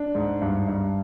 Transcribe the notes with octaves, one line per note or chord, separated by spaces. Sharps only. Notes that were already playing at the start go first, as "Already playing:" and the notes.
Already playing: D4
G#2
G2
G2